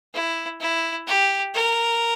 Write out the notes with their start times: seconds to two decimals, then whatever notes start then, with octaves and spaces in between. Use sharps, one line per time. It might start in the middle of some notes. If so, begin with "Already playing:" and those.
0.14 E4
0.60 E4
1.07 G4
1.55 A#4